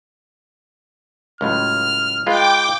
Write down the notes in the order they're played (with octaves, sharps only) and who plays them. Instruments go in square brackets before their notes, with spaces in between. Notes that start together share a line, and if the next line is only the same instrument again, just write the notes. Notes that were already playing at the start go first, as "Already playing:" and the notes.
[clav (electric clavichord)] C#2 A2 F#3 [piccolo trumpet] F6
[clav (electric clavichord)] G#3 F4 B4 [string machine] G5 D6